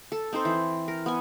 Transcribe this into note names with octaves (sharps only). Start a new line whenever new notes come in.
A4
C4 D#4 A4 C5
E3
A#4
B3 G#5